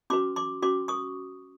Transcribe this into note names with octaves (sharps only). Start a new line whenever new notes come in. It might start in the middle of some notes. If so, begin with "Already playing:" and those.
C#4 F#4 B4 C6 D6
C6 D6
C#4 F#4 B4 C6 D6
C#6 D#6